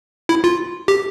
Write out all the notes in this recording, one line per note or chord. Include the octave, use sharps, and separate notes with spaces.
E4
F4
G4